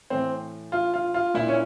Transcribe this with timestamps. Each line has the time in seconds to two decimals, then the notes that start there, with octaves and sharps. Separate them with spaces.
0.10 A2 E3 C4
0.72 F4
0.94 F4
1.14 F4
1.34 A#2 E4
1.48 C#4